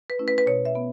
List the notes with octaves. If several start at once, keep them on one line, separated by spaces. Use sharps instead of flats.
B4
A3 C#4 E4
B4
B4
B2 C#5
E5
B3